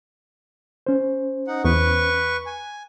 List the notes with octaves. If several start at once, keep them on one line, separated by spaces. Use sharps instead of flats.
C#4 C5
D#4 F#5
E2 B4 C#6
G#5